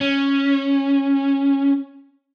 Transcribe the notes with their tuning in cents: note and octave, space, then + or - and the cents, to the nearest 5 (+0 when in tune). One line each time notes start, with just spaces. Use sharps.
C#4 -5